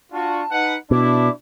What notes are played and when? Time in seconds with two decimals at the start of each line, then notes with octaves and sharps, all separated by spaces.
0.12 D4 F4 F#4 A5
0.51 D#4 B4 F#5
0.91 B2 D4 E4 D6